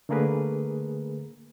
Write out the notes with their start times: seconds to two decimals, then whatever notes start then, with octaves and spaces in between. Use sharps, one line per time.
0.09 D3 A3 A#3 G#4 A#4 B4